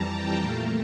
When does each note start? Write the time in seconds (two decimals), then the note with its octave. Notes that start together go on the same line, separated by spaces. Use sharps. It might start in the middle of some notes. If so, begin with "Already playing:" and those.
Already playing: F2 E3 G3 A5 A#5
0.13 G5
0.41 A#2 A3 F5